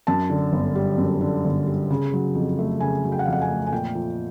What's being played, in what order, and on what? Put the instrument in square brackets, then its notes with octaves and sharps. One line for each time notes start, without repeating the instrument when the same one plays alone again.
[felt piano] F#2 A5
D3
G1
G3
F#2
D3
G1
G3
C#3
F#3
F2
A3
C#3 G#5
F#3
G5
F#5
F2 F5
F#5
G#5
A3
G#5
A#2 G5
F3